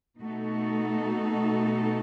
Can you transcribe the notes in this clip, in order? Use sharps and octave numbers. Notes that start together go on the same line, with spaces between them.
B2 A3 D#4 F#4 A4